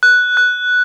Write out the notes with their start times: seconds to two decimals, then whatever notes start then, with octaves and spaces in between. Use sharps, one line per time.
0.03 F#6
0.37 F#6